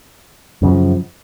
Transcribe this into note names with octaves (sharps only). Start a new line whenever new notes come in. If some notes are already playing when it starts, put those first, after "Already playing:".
F#2 C#3 F3